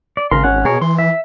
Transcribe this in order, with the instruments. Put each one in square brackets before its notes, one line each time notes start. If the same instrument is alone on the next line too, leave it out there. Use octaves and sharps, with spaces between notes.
[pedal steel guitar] D5
[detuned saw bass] G#1 [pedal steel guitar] C#3 A#4 C6
[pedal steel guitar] C#4 F#5
[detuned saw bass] B2 [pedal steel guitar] G#4 A#4 C#5
[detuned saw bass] E3 [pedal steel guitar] C6
[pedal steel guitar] E5